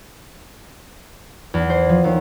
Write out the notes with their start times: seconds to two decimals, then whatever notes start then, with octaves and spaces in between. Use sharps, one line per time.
1.54 E2
1.70 C5
1.89 F3
2.04 D#2